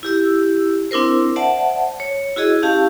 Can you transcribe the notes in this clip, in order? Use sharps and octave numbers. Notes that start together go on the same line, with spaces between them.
E4 G4 E6
C4 D4 E4 A#4 C5
C5 D5 E5 F#5 A5
C#5
E4 F#4 G#4 D#5
C#4 E4 G4 F5 A5